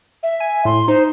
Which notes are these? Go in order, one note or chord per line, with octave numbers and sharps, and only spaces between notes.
E5
G#5
A2 C6
D#4 C5